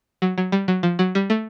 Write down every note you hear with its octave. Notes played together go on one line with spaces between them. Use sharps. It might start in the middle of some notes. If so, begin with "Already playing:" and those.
F#3
F#3
G3
F#3
F3
F#3
G3
A3